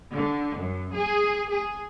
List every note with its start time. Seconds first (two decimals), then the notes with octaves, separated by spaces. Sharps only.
0.14 D3
0.56 F#2
0.95 G#4
1.50 G#4